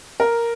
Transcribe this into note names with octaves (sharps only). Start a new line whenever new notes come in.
A#4